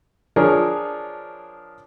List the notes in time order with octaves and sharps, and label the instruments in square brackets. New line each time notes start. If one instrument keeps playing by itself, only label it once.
[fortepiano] F3 D4 G#4 A#4 C#5